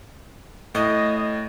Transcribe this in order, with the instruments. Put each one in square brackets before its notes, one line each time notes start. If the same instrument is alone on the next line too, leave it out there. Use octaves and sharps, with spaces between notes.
[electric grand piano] A2 [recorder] D#5